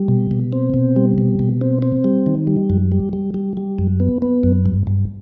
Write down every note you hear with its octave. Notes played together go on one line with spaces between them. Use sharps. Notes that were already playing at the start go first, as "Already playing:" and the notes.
Already playing: G3
B2
B2
C4
B2
G3
B2
B2
C4
C4
G3
D#3
G3
F#2
G3
G3
G3
G3
F#2
B3
B3
F#2
G2
G2